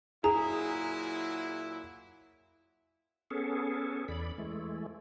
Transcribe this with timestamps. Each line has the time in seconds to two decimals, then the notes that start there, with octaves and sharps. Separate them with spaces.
0.24 A#2 F#3 E4 G#4 A#5
3.31 B3 C#4 G#4 A4
4.08 E2 D5 B5
4.38 E3 G#3 A3